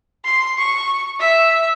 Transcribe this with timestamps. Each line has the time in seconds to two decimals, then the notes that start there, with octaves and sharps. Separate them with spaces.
0.25 C6
0.58 C#6
1.19 E5